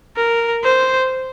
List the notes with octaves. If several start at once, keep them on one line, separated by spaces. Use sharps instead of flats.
A#4
C5